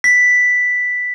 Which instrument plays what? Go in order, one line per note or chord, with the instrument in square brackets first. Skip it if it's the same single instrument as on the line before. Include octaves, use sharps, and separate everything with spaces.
[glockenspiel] B6